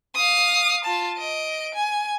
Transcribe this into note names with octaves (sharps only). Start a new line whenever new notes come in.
F5 D#6
F4 A5
D#5 D7
G#5